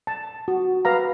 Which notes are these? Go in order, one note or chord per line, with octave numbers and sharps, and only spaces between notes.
A5
F#4
B4 F5 A#5